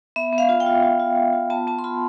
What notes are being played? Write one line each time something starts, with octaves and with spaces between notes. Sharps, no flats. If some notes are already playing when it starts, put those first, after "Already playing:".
B3 E5
B3
F5
F4
G5
F4
F4
F4
F4
F4
B3 A5
B3 A5
C6
F4 B5